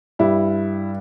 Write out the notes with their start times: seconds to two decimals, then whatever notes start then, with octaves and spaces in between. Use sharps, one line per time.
0.19 G2 G3 E4